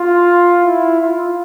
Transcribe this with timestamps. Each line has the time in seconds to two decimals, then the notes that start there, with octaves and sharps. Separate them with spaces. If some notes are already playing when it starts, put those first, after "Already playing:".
Already playing: F4
0.63 E4
1.00 F4